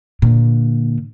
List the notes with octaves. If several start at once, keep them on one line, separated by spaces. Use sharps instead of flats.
A#2 D3